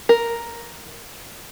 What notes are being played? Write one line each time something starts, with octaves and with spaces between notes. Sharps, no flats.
A#4